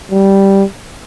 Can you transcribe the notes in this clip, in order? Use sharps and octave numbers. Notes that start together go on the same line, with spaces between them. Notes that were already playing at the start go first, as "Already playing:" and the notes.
G3